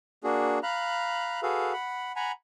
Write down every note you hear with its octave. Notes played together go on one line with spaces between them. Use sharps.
A#3 D4 F#4 G#4
F5 A#5 B5 F#6
F#4 G#4 A4 B4 F5
F#5 B5
F#5 G#5 A#5 B5